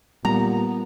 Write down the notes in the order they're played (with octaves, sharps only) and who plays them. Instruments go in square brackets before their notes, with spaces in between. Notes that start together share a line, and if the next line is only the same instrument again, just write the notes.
[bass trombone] A#2 [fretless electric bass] G3 [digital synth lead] B3 [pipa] A#5